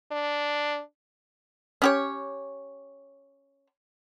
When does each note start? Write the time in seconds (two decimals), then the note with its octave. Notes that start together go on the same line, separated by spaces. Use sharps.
0.12 D4
1.82 C#4 G4 C#5